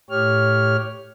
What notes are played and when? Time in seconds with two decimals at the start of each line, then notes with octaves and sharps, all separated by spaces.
0.10 A2 G4 C#5 F6